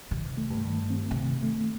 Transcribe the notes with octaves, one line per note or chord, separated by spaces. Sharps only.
C3 D#3
A3
G2
D#3
C4
C3
D#3
A3